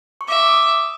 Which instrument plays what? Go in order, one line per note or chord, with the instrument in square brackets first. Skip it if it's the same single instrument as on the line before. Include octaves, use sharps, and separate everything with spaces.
[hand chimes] C#6
[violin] E5 [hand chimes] D6
[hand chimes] D6
D#6